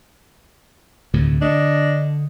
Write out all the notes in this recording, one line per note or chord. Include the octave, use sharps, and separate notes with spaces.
D2 A2 C3
D3 D4 D#5